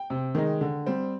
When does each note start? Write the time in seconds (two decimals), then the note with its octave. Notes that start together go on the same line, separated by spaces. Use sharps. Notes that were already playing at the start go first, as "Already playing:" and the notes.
Already playing: G5
0.10 C3
0.35 D#3 G#3 D#4
0.61 D3
0.86 G3 C4